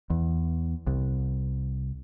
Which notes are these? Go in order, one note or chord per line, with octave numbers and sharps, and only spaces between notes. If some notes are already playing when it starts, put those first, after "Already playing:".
E2
C2